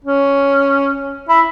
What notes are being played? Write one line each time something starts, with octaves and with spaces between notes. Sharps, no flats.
C#4
E4